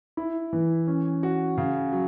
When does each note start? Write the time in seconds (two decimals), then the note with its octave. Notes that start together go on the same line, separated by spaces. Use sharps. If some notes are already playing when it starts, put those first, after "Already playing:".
0.17 E4
0.53 E3
0.87 C#4
1.23 F#4
1.58 C#3
1.92 F#3